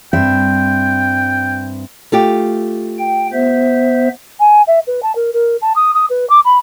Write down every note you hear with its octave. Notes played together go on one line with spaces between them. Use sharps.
G2 C4 E5 G5
A3 F4 G4
G5
B3 C5 E5
G#5
E5
B4
A5
A#4
A#4
A5
D#6
D#6
B4
D6
B5